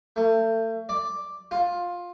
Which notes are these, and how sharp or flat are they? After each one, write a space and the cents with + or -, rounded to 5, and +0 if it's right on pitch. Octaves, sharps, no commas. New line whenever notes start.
A3 +35
D5 +0
F4 +15